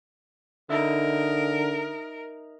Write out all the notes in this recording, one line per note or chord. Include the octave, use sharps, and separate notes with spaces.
D3 D#4 A#4 E5